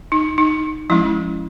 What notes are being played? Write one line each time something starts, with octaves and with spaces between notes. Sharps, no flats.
D#4
D#4
F3 G#3 C#4 E4